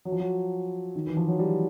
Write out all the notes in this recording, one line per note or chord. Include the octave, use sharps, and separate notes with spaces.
F#3
F3
F#3
D#3
E3
F3
F#3
G3